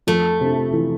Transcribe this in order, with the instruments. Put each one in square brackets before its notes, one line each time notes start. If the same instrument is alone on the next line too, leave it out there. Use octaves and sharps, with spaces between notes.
[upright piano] F2 [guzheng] A3
[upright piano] C3
E3